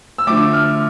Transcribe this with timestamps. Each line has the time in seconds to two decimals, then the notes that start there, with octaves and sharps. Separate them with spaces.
0.18 E6
0.27 D3 F3 A3 D6
0.53 F6